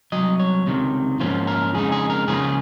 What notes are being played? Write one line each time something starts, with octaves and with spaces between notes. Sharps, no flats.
C2 C3 F#3 D#5
C#5
C#2 C3 D#3
G#2 F3 A#3 C#4 F4 C5
A#4
F2 C#3 G#3 D#4 G#4
G#4
A#4
C#2 C#3 F3 A#3 F4 G#4